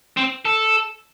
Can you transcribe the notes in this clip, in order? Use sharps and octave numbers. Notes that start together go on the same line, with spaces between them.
C4
A4